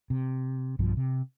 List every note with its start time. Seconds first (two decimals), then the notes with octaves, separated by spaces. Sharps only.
0.10 C3
0.79 B1 G2 B2 F3
0.97 C3